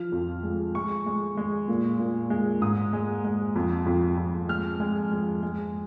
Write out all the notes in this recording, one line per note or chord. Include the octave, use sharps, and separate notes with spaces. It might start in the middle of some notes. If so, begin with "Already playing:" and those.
Already playing: F3 F6
F2
G#3
G#3 C#6
G#3
G#3
A#2
A#2
G#3
G#2 D#6
G#3
G#3
F2
F2
F2
G#3 F6
G#3
G#3
G#3